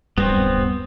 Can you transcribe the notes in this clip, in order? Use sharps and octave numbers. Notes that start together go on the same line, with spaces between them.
D1 G2 G3 B3 C4